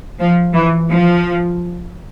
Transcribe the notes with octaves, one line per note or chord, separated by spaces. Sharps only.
F3
E3
F3